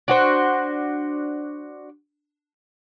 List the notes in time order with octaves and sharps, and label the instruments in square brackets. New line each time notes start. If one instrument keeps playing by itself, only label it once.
[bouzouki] D4 F#4 C5